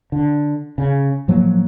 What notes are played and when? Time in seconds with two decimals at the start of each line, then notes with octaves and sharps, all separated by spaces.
0.12 D3
0.78 C#3
1.28 A2 F3 F#3 A#3